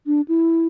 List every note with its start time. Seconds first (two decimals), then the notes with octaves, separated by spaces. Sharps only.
0.07 D4
0.28 E4